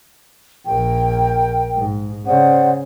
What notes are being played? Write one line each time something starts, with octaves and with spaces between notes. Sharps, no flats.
A#1 A#4 G5
G#2
C#3 C5 D5 F#5